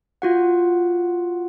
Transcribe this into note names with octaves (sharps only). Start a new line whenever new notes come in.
F4 F#4 F#5